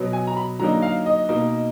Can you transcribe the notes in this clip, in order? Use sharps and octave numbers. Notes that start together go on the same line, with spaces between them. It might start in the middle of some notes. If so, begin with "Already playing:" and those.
Already playing: B2 F#3 B3
G#5
A#5
B5
D3 F#3 A#3 D#4 A#5
F5
D#5
B2 A#3 D#4